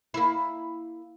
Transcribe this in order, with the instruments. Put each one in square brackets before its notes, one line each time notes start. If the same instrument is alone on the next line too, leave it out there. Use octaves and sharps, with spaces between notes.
[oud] A#3 E4